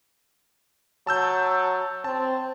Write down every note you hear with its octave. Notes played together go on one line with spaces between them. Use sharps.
F#3 A5 E6 G6
C4 A5